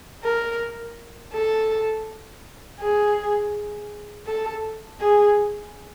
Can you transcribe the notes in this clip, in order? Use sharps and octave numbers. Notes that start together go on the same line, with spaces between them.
A#4
A4
G#4
A4
G#4